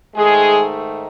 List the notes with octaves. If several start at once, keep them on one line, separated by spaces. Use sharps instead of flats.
G#2 D#3 G#3 A3 G#4